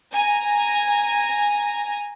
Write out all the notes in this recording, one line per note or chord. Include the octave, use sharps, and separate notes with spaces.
G#5 A#5